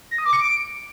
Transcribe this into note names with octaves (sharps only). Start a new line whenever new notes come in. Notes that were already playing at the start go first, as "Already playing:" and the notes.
A#6
D#6
D6
C#7
D7